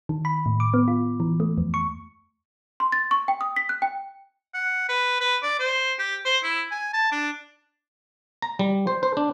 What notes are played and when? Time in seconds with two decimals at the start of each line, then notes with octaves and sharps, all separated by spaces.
0.09 D#3
0.25 B5
0.46 A2
0.60 D6
0.74 B3
0.88 F4
1.20 E3
1.40 A3
1.58 F2
1.74 C#6
2.80 C6
2.92 A6
3.11 C#6
3.28 G5
3.41 D#6
3.56 B6
3.69 F#6
3.82 G5
4.54 F#5
4.89 B4
5.20 B4
5.43 D5
5.59 C5
5.99 G4
6.25 C5
6.43 E4
6.71 G#5
6.93 A5
7.12 D4
8.42 A#5
8.59 G3
8.87 C5
9.03 C5
9.17 D4